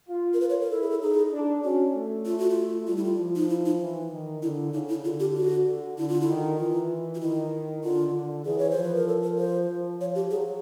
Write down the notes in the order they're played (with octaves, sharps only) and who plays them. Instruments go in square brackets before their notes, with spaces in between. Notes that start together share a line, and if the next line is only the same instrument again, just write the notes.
[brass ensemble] F4
[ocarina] A#4
B4
C#5
A#4
[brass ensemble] E4 [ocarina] A4
[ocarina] G#4
A4
[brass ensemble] D#4 [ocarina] G#4
[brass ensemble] D4
[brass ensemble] C#4 [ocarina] F#4
[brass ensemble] A3
[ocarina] F4
F#4
F4
[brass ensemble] G3 [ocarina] F4
[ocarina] E4
F4
[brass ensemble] F3
[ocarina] D#4
E4
D#4
[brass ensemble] E3
D#3
[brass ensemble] D3 [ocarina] E4
[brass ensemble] C#3 [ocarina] D#4
[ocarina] E4
[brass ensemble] D3 [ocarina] F4
[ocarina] G4
F#4
[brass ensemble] D3
[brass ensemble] D3 [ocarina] E4
[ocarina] F4
E4
[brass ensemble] D#3
[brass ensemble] E3 [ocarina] F4
[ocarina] F4
[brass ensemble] D#3 [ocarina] E4
[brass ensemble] D3 [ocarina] F4
[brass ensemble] D3
[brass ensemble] E3 [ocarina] G#4
[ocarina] C#5
C5
[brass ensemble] F3
[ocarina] B4
A#4
A4
A#4
C5
[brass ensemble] F3
[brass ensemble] F3 [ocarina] C#5
[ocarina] G4
[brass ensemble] F#3 [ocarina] G#4